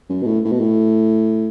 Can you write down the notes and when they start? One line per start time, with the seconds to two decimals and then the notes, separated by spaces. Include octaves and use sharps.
0.10 F#2
0.23 B2
0.27 A2
0.45 A2
0.52 B2
0.60 A2